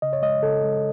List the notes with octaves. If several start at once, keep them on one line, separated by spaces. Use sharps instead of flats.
C#3 D#5
C#5
G#3 D#5
C#3 A4
G#3